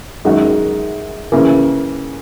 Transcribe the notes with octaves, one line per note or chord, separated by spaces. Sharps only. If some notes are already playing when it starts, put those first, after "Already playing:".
F#2 D#3 G#3 D#4 F#4
C#3 E3 A#3